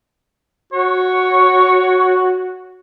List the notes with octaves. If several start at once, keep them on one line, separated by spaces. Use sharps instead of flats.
F#4 C#5